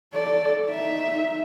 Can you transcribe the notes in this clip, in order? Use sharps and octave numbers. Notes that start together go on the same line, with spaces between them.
A4 D5
D#4 E5